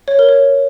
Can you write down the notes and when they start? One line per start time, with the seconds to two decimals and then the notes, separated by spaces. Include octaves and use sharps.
0.08 C#5
0.19 A#4
0.29 C#5